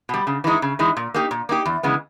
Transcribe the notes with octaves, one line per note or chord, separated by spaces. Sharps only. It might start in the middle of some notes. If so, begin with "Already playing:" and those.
B2 G3
C#3
E3 G#3 D#4
C#3
E3 G#3 D#4
A#2
A#3 D#4 G4
A#2
A#3 D#4 G4
E2
C#3 E3 G#3 B3